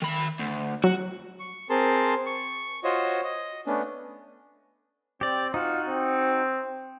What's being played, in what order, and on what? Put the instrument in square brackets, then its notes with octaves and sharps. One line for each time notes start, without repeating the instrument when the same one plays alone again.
[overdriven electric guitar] D#3 B5
D2
[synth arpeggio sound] F#3 [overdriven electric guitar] F#4
[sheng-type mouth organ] C#6
C4 G#4 A#4 A5 C6
C#6
F4 F#4 C5 C#5 D#5
D#5
A3 B3 C#4 D4
[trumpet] C4 [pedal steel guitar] G4 D5
[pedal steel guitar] D#4 F#4 [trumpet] F4
[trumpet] C4